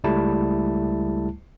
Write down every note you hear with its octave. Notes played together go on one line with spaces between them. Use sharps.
C#2 G3 A3 E4 A5